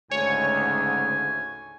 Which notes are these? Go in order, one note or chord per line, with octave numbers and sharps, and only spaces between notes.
D2 G#2 C#3 C#5 G#5